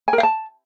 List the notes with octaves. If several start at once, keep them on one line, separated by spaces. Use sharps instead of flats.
G#5
A#4
F5
A5